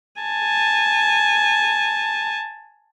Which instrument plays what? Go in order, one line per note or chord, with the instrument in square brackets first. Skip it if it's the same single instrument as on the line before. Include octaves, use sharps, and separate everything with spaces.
[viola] G#5 A5